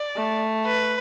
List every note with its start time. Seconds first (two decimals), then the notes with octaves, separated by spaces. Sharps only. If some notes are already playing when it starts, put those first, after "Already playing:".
Already playing: D5
0.16 A3
0.66 B4